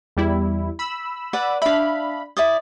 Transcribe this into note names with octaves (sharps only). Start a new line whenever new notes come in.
E2 G3 E4
B5 E6
B4 D5 F#5
D4 E5 F5 B5
E4 D5 D#6